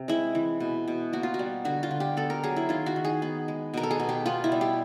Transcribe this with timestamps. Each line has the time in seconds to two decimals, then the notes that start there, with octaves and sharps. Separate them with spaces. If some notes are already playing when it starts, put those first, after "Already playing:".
Already playing: C3
0.08 G#3 E4
0.35 E3
0.60 B2
0.88 B2
1.13 A#3 F#4
1.23 F4
1.34 F#4
1.39 G3
1.65 D3 F#4
1.83 F4
1.91 D3
2.00 G4
2.17 B3 A4
2.30 A#4
2.43 F#3 G#4
2.56 E4
2.69 D#3 F4
2.86 F#4
2.96 D#3
3.05 G#4
3.22 B3
3.48 G#3
3.74 B2 A#4
3.83 A4
3.91 G#4
4.00 B2
4.09 G4
4.26 B3 F4
4.44 E4
4.52 G3
4.61 G4